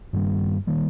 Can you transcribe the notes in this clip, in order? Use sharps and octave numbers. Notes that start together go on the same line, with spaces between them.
G2 D#3 G3 A#3
D#3 G3 A#3